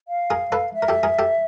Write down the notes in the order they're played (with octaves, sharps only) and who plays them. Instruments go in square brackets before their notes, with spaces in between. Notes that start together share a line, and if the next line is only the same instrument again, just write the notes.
[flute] F5
[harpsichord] G#4 A#4
A4 B4
[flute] E5
[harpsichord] A#4
G4 A4
G#4 A#4
G4 A4